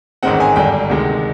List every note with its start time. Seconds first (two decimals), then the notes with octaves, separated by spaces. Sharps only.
0.23 A1 G#2 D#3 G#3 C4 F#5
0.40 G#5
0.56 G#1 G2 D3 G5
0.90 D2 C3 D#3 G#3